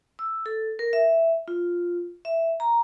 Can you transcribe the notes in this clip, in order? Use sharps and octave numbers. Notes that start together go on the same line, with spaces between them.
E6
A4
A#4
E5
F4
E5
A#5